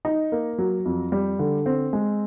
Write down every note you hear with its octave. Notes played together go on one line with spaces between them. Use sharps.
D#4
A#3
F#3
F2
G3
D3
C4
G#3